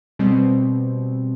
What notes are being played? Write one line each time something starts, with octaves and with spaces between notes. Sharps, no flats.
B2 G3 C4